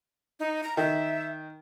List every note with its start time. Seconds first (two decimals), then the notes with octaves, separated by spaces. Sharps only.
0.40 D#4
0.63 A#5
0.77 D#3 E5